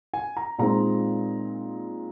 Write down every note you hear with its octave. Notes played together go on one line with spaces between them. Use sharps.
G#5
A#5
A#2 G#3 C4 D#4 A#5